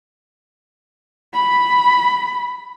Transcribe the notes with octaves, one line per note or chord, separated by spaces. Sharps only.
B5